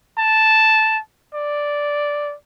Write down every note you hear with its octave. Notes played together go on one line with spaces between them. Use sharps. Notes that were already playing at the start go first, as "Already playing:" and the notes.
A5
D5